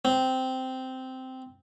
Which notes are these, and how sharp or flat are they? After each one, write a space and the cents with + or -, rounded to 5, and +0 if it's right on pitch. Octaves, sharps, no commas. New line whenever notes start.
C4 -10